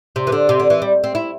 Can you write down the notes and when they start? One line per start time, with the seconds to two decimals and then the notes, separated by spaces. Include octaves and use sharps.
0.16 C3
0.27 E3
0.32 D3
0.49 C3
0.60 D3
0.70 E3
0.82 G3
1.04 C4
1.15 E4